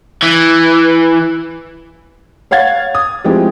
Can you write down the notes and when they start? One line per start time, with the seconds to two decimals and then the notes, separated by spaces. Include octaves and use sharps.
0.23 E3
2.51 C#5 F5 F#5 G#6 A6
2.95 D#6
3.24 F3 G#3 C4 E4 G4